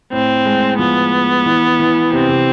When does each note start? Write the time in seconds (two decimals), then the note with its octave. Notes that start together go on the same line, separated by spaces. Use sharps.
0.12 A2 C4
0.46 G#3
0.79 F3 B3
1.46 E3
1.80 E3
2.13 C3 C4
2.29 C3